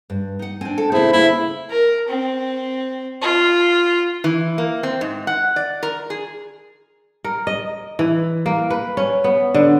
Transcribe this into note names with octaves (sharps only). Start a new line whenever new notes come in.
G2
D#4 F#5
C4 D4 G#5
A4
C#3 B3 C4 E4 G#4
D2 A#3 E4 F5
A#4
C4
F4
E3
A#3
C4
G#2
F#5
D5
A#4
G#4
A#4
D#5
E3
A#3
B4
C#4
B3
D3